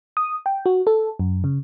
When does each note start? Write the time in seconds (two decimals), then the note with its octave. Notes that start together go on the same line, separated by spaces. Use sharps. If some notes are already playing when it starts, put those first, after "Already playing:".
0.17 D#6
0.46 G5
0.66 F#4
0.87 A4
1.19 F#2
1.44 C#3